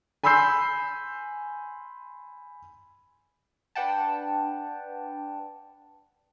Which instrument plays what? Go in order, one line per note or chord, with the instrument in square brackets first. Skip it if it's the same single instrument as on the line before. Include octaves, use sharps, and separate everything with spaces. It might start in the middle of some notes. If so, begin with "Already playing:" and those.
[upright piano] G#5 B5 C6 E6 G6 C7
[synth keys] D4 B4 D5 F#5 G5 A5